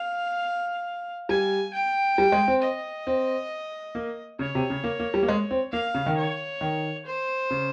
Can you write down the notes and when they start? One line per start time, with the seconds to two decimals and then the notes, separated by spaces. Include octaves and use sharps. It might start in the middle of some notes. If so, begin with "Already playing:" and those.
Already playing: F5
1.29 G3 G#5
1.74 G5
2.18 G3
2.32 G#3
2.48 C4
2.62 D#5
3.07 C4
3.95 A#3
4.39 C#3 C#5
4.55 C3
4.70 C#3
4.84 A#3
5.00 A#3
5.14 G3
5.23 A#3
5.29 G#3
5.51 C4
5.73 A#3 F5
5.94 C#3
6.06 D#3
6.17 C#5
6.61 D#3
7.06 C5
7.51 C#3